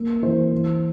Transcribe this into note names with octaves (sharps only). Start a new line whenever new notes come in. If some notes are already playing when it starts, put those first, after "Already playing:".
Already playing: A#3
E3 C5
E3